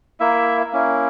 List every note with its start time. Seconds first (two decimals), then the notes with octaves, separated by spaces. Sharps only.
0.20 A#3 E4 E5
0.73 A#3 C#4 E4